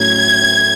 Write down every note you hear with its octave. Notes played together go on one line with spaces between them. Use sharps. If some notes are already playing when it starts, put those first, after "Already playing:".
Already playing: A2 F#3 A3 C#4 G#6